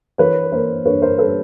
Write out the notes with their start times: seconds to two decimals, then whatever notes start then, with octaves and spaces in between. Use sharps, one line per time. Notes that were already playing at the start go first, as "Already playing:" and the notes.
0.18 E3 B4 C#5
0.52 A#3 A#4 C5
0.85 G2 B4 C#5
1.02 A#4 C5
1.18 G3 A4 B4